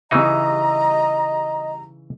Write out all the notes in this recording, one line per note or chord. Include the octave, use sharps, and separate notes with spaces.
C#3 E3 G3 D#4 D#5 E5 A#5